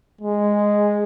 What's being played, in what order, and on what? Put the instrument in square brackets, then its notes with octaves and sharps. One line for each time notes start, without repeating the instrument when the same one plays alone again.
[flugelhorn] G#3